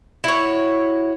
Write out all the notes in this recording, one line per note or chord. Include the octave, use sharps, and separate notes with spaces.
E4 F#4 C#5